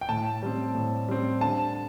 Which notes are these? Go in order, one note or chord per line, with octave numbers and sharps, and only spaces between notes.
G5
A2 A5
G3 C4
A2
G3 C4
D3 A5